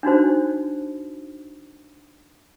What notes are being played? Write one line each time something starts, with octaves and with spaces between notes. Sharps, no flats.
D4 D#4 F#4 C5